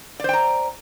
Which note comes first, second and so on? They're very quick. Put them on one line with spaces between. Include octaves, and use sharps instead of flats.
D5 C5 G5 A#5